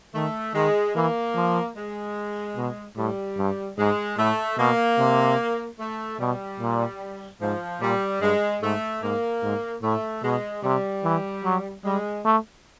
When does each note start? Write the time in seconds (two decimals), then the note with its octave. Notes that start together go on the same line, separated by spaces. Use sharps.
0.14 D#3 A3
0.55 D#3 G#3
0.95 E3 A#3
1.35 F3
1.76 G#3
2.57 B2
2.97 A2 G3
3.37 G2
3.78 G#2 G#3
4.18 A2 A3
4.58 B2 A#3
4.99 C3
5.79 A3
6.19 B2 G3
6.60 A#2
7.41 G#2 F3
7.81 A#2 G3
8.21 G2 G#3
8.62 G#2 A3
9.03 G#2 A#3
9.43 G#2
9.83 A2 A3
10.23 B2 G#3
10.63 C3 G3
11.04 E3
11.44 F#3
11.85 G3 G#3
12.25 A3